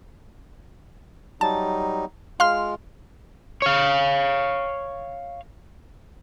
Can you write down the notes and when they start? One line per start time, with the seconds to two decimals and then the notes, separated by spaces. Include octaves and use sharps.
1.41 F#3 G3 D#4 A5
2.40 G#3 F4 F5 C6 F6
3.62 C#5 F5